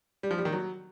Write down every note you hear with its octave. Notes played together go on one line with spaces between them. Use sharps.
G3
F3
G3
D#3
F#3